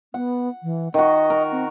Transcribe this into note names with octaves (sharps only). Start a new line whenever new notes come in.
B3 F#5
E3
D#3 F#4 D#5
A#4
C4